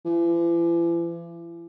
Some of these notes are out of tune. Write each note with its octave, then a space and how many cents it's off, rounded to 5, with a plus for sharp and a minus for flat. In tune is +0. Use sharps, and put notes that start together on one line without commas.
E3 +45